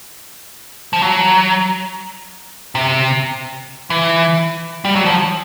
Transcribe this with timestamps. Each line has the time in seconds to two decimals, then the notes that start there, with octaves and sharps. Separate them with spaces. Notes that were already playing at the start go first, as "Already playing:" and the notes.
0.93 F3
1.01 F#3
2.75 C3
3.90 E3
4.85 G3
4.96 F#3
5.06 F3